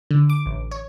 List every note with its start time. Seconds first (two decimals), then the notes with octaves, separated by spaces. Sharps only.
0.11 D3
0.29 D6
0.46 A1
0.71 C#5